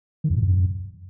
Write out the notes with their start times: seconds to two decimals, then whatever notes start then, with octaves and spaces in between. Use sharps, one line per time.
0.24 D#3
0.30 F2
0.36 A#2
0.42 F#2